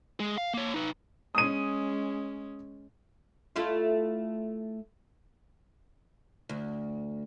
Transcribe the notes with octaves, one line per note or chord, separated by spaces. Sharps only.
G#3 G#4
F5
A#3 C#5
D#4 B4
G#3 C#4 D#6 D#7
A3 E4 F4
D2